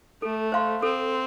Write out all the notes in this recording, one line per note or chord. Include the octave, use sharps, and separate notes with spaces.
A3 A4
C5 F5 C6
C4 A4